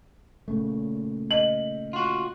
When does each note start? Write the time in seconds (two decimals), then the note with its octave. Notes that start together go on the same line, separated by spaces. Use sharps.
0.48 A#2 C#3 A3
1.31 D#5 F#7
1.93 F4 F#4